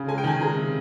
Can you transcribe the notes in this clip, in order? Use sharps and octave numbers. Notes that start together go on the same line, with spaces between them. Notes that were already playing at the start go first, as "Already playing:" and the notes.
Already playing: C#3
G#3 G#5
G5
D#3 G#5
G#3 A#5
C3